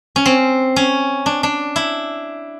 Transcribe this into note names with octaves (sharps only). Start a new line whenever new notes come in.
C#4
C4
C#4
D4
D4
E4